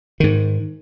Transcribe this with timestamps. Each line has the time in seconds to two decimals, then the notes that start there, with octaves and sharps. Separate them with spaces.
0.20 G#2 D#3